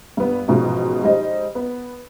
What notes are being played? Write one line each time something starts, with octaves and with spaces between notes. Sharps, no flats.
G2 B3
A1 G#2 B2 F3
G3 G#3 D#4 C5 D#5
B3